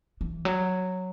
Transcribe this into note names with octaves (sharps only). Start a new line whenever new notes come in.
E3
F#3